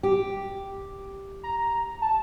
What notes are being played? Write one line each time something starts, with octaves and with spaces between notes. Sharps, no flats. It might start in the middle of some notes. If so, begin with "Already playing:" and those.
G4
A#5
A5